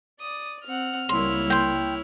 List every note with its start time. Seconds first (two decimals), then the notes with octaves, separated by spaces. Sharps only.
0.20 D5 D#6
0.66 C4 F#5 F6
1.09 C#2 G3 A#3 E4 C#5 C6
1.50 G5 C6